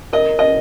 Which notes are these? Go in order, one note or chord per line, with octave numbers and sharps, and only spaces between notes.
A#4 D#5
D#5